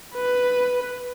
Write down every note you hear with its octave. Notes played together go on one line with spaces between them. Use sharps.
B4